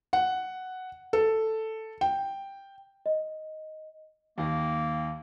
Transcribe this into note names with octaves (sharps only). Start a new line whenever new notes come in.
F#5
A4
G5
D#5
D#2 D#3 A#3